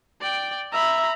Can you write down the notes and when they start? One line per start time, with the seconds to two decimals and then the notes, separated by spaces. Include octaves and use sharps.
0.21 D5 G5
0.72 E5 A#5 B5